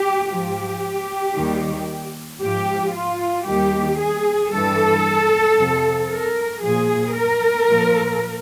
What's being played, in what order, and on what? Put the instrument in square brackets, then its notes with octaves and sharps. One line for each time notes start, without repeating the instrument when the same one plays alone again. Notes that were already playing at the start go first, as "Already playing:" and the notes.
Already playing: [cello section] G4
G#2 F3 G4
D#2 D#3 G3
G#2 F3 G4
F4
D#2 D#3 G3 G4
G#4
G2 E3 G3 A4
F2 C3 F3
A#4
A#2 F3 G#4
A#4
A#2 F3